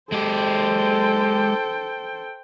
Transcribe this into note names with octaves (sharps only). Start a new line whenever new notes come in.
G#3 G4 A4 C5 G5